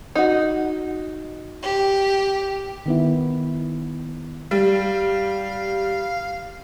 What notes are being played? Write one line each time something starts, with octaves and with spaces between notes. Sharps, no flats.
D#4 F#4
G4
D#3 B3 E4
G3 F5